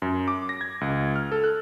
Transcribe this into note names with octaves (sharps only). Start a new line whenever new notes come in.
F#2
D6
A#6
G#6
C#2
F6
A4
F#6